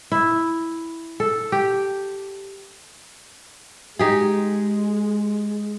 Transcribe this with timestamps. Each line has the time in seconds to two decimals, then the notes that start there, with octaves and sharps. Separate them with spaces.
0.12 E4
1.20 A4
1.52 G4
3.99 G#3 D#4 G4 G#4